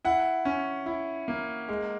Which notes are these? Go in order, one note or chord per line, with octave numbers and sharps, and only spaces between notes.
E4 F#5
C#4
E4
A#3
G#3